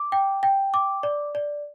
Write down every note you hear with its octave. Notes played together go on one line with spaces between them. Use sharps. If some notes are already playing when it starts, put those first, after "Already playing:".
Already playing: D6
G5
G5
D6
D5
D5